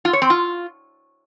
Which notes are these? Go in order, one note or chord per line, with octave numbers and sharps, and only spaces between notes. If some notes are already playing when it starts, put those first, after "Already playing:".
F4
C#5
C4
F4